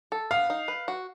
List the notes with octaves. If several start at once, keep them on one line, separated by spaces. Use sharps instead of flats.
A4
B3 F5
D#4
B4
F#4